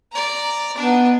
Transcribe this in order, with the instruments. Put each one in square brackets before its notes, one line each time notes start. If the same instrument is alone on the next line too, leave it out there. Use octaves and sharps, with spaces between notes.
[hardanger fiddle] D5 A#5
[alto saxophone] B3 [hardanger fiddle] D4 D#4